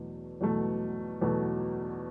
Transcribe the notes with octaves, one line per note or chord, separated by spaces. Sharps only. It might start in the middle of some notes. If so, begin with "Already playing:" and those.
Already playing: E2 B2 F#3 A3
E2 B2 F#3 A3
E2 B2 F#3 A3